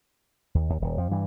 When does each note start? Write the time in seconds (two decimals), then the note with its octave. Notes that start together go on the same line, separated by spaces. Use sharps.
0.55 D#2
0.70 D#2
0.81 D#1
0.98 F2 F3
1.11 G2 E3 G3